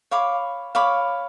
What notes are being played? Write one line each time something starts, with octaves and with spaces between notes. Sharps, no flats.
C#5 F5 B5 D6
C#5 F5 B5 D6